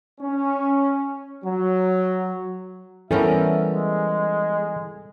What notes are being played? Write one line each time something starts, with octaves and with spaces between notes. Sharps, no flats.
C#4
F#3
E3 G3 B3 C#4 A4 A#4 E5
G#3